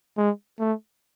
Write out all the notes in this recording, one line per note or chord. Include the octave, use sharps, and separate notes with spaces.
G#3
A3